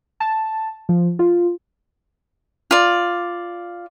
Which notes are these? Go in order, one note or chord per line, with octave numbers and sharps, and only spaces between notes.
A5
F3
F4
F4 D5